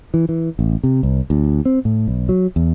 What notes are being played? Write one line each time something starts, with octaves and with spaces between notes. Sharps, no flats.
E3
E3
A1
C3
C2
D2
C4
A2
B1
F#3
E2